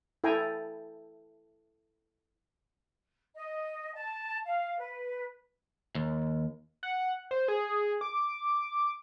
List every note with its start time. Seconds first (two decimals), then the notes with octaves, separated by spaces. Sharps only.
0.24 E4 A4 G5 G#5 A#5
3.34 D#5
3.94 A5
4.45 F5
4.78 B4
5.95 D#2
6.83 F#5
7.31 C5
7.48 G#4
8.01 D6